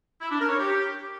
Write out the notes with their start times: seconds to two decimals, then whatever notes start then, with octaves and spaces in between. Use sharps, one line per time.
0.21 E4
0.30 D4
0.40 A#4
0.49 C#5
0.58 G4